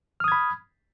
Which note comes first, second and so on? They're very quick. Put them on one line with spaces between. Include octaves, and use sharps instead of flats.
F6 D#6 G#6 B5